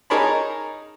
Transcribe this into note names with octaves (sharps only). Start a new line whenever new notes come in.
D#4 G#4 A#4 C#5 A5 B5